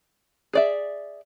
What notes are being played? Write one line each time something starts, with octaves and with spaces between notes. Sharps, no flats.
G#4 D5 E5